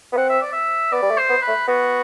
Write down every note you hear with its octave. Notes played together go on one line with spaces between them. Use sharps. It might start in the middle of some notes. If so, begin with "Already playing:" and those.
B3
C4 F#5
E5
D5
E5
B3 D5
G3
A3
C5
B3
B4
A3
B3 F#4